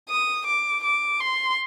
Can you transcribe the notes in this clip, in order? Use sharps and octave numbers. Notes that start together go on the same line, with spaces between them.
D#6
D6
D6
C6